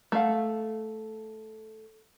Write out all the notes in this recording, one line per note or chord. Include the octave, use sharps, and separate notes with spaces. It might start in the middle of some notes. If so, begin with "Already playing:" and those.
A3 A4 F5 F#5